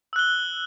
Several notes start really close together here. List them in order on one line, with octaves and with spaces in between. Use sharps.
E6 F#6 G7